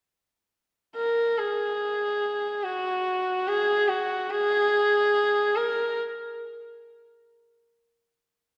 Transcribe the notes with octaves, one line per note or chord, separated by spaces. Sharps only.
A#4
G#4
F#4
G#4
F#4
G#4
A#4